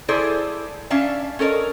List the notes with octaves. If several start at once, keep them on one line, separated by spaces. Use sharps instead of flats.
E4 G#4 A4 C5 D5
C#4 D4 E5 F5 A5
C#4 A4 A#4 C#5 D#5